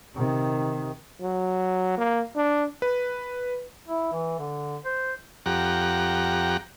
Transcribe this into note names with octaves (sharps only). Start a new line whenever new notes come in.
C3 D#3
F#3
A#3
D4
B4
E4
E3
D3
C5
F2 G4 F#5 A#5